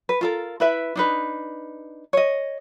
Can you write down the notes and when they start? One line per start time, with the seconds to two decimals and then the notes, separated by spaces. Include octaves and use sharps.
0.09 B4
0.21 F4 A4 A#4
0.60 E4 B4 E5
0.95 D4 D#4 B4
2.13 C#5 D#5